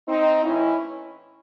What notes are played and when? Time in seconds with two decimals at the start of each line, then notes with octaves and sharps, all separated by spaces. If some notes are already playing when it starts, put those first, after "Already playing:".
0.08 C4 D#4
0.44 A2 E3 C#4 E4